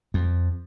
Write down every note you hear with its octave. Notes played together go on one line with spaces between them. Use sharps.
F2